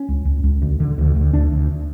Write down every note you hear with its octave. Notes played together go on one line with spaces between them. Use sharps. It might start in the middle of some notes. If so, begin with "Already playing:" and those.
Already playing: C#4
C#2
C#2
C#2
D2
D3
D2
D2
D2 D4
D2